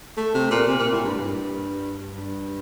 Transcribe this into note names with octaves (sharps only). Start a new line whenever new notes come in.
A3
C3
A#2
C3
A#2
A2
G2
G2
G2